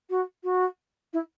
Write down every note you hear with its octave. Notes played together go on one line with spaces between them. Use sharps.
F#4
F#4
E4